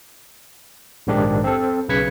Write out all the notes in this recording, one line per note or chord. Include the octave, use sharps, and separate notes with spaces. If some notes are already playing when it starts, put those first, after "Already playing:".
A#1 G#2 D#3 D4 G4
C4 A4
B1 C#3 B4 G#6 B6 C#7